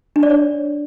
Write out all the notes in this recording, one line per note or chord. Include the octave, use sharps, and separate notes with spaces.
D4
D5
C#5